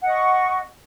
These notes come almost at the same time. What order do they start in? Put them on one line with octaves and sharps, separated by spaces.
F#5 D#5 C#6